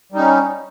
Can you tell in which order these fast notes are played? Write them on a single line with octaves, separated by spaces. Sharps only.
G3 D#4 C#4